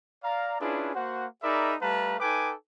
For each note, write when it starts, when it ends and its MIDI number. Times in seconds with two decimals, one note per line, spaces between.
0.24 0.58 74
0.24 0.58 77
0.24 0.58 82
0.60 0.95 61
0.60 0.95 62
0.60 0.95 64
0.60 0.95 65
0.60 0.95 68
0.60 0.95 71
0.95 1.26 58
0.95 1.26 66
0.95 1.26 72
0.95 1.26 78
1.43 1.75 63
1.43 1.75 68
1.43 1.75 70
1.43 1.75 74
1.43 1.75 76
1.43 1.75 83
1.82 2.16 55
1.82 2.16 57
1.82 2.16 71
1.82 2.16 77
1.82 2.16 81
1.82 2.16 82
2.20 2.54 63
2.20 2.54 69
2.20 2.54 71
2.20 2.54 79
2.20 2.54 80
2.20 2.54 86